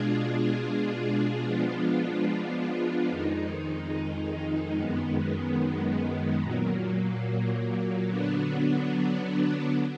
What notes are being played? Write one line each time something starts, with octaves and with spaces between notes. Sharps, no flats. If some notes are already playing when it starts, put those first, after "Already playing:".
Already playing: B2 G#3 D4 F4 G#4
F3 G#3 B3 D4 F4
F2 D#3 G#3 D#4
F#2 D#3 G#3 B3
A#2 F#3 A#3
D3 F#3 B3 D4